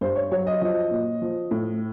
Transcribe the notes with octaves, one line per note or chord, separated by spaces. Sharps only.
G2 C5
C#5
F#3 C#5
D#5
F3 D#5
A#2
F3
A2